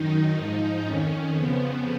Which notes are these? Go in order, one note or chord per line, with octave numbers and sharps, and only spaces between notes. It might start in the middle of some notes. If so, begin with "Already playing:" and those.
Already playing: F#2 D#3 D#4
G#2 F3 D#4
F2 D#3 C#4
F2 C#3 F3 B3